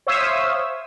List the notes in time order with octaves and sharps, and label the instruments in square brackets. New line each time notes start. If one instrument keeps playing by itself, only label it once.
[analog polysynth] C5 C#5 E5 F5 D#6 E6